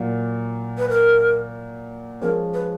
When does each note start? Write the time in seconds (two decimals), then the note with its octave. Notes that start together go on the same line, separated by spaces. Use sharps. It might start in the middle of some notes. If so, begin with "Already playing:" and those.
Already playing: A#2 F#3 A#3
0.78 B4
0.90 A#4
2.21 F3 G#3 C#4 A#4
2.54 B4